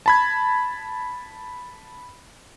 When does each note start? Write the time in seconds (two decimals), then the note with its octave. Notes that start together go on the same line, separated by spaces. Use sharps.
0.06 A5 B5 G#6